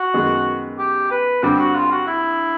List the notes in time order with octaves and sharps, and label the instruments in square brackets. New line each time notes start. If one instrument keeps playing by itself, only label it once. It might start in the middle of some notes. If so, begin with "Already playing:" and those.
Already playing: [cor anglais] F#4
[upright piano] F#2 D#3 G#3 B3
[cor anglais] G4
B4
[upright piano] G2 D3 G3 C4 [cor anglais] G4
[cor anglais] F#4
F4
F#4
E4